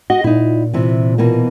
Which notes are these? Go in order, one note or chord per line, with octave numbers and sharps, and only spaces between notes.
F#4 D#5
A#2 D#4 E4
C3 E3
B2 E3 A#3